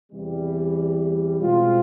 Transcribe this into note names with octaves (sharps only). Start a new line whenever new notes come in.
E2 C3 E3 G3
B2 G#3 C4 F4